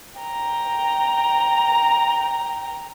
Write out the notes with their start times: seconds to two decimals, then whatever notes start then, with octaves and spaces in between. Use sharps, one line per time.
0.20 G5 A#5